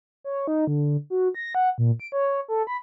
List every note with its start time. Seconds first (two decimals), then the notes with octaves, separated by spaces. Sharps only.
0.24 C#5
0.47 D#4
0.67 D3
1.10 F#4
1.35 A#6
1.55 F#5
1.78 A#2
2.00 D7
2.12 C#5
2.48 A4
2.67 B5